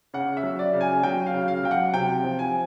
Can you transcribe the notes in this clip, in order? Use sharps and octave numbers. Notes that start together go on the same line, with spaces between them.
C#3 F#5
E5
F#3
D5
C#3
G#5
F#3 G5
F5
C#3
F5
F#3 G5
F#5
C3 G5
F3
G#5